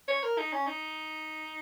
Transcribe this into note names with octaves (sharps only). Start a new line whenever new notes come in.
C#5
A#4
D#4
C#4
D#4